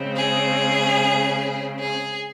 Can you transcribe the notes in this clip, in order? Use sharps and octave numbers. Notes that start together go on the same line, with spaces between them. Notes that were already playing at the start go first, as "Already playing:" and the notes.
Already playing: C#3 G#3 C4
G#4
G#4